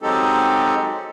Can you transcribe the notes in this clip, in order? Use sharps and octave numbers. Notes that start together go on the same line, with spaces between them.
F#3 G#3 C4 D#4 G4 A4